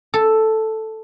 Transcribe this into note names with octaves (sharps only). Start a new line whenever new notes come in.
A4